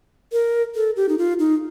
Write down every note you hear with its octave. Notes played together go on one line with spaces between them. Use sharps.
A#4
A4
G4
D#4
F4
D#4